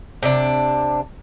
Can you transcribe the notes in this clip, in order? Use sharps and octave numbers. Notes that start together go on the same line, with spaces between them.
C3 D4